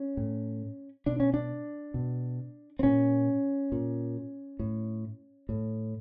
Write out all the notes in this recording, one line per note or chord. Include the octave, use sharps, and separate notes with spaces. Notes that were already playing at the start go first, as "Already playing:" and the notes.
Already playing: C#4
A2
B2 D4
C#4
D4
B2
C4
A#2 C#4
A#2
A2
A2